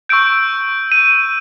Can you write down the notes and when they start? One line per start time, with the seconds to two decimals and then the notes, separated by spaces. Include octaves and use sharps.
0.09 C#6 E6 G6 D7
0.92 D#7